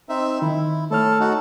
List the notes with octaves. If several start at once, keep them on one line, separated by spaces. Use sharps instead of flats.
C4 D#4 E5
D#3 E4
A3 A4 C#5 F6
D#4 F#4 A4